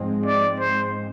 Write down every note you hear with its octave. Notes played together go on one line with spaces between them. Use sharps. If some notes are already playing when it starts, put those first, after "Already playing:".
Already playing: G#2 F3 G#3 C4
D5
C5